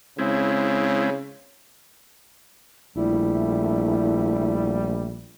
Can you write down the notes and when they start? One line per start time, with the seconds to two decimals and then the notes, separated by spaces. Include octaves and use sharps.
0.19 C#3 G#3 C4 E4
2.96 A#1 G3 A3 E4